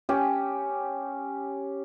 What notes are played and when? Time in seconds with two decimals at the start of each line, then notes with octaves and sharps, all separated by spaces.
0.09 C#4 G4